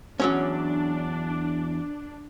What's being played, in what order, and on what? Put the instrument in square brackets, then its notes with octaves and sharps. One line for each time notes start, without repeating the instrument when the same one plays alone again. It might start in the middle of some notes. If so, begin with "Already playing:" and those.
[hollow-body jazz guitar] E2 F#3 C#4 [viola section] D4